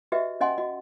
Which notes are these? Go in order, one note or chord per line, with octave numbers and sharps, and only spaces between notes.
F#4 G4 B4 D#5 E5
C#4 D#5 F#5 G#5 C6
F#4 D#5